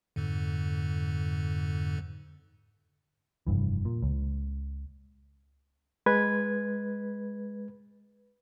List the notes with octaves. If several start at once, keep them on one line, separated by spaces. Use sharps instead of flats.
F2 G#2 D3
F1 C2 G2 E3
A#2
C#2
G#3 B4 G#6